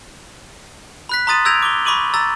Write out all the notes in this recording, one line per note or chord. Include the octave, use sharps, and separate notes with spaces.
B5 F#6 B6
A#5 C6 D#6 A6 D#7
E6 G6 G#6 A#6 D7 F7
D6 G7
B5 C#6 D6 D#7 F#7
A#5 E6 A6